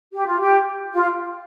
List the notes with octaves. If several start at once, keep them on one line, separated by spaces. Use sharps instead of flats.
G4
F4
G4
F4